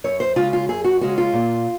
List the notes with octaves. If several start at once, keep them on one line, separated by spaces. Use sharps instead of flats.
F#2 C#5
C5
C#3 G#3 C#4 F4
F4
F#2 G#4
F#4
C#3 G#3 C#4 F#4
F4
A#2